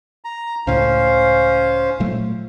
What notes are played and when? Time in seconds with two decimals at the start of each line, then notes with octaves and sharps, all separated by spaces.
0.25 A#5
0.67 C#2 A2 C#4 C5 F5
2.00 A#2 F#3 A3